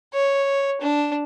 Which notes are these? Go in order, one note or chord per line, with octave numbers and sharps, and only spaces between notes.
C#5
D4